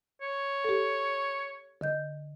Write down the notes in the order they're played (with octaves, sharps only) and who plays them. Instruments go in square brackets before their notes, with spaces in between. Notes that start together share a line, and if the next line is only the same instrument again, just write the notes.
[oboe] C#5
[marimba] G4 A4
D3 D#5 G6